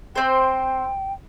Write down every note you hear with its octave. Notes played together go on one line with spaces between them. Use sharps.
C4 C5 G5